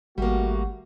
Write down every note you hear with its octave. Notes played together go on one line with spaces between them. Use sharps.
G#1 G3 A3 A#3 F#4